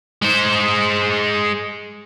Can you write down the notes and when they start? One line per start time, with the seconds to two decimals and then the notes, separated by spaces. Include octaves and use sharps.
0.22 G#3 C5